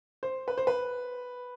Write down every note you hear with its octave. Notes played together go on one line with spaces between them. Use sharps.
C5
B4
C5
B4